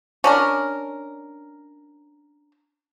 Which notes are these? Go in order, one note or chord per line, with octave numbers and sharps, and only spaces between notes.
C#4 D4 A#4